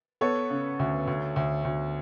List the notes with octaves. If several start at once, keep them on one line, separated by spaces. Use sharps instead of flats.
B3 A4 C#5
C#3
D2
D2
D2
D2